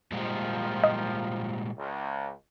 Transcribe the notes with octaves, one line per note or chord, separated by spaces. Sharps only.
A#2 D#3 F3 G3 G#3
D#5
C#2